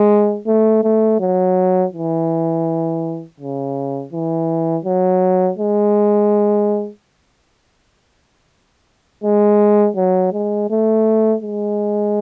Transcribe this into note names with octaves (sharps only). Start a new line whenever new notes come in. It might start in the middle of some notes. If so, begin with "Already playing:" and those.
Already playing: G#3
A3
A3
F#3
E3
C#3
E3
F#3
G#3
G#3
F#3
G#3
A3
G#3